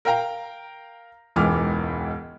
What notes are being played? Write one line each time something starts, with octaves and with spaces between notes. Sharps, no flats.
A#4 F5 G5 A#5
E1 C#2 G#2 E3 D6 F6